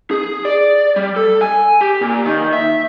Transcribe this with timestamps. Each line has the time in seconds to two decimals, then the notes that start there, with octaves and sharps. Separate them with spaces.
0.11 G#4
0.45 D5
0.96 G3
1.16 A4
1.41 G#5
1.81 G4
2.01 A#2
2.25 D#3
2.53 E5